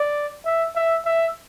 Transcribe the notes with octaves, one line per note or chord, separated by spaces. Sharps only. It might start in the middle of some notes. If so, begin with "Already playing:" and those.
Already playing: D5
E5
E5
E5